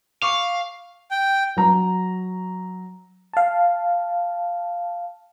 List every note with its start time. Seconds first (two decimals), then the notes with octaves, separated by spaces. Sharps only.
0.22 F5 C#6 D6
1.11 G5
1.57 F#3 A#5
3.33 F5 A5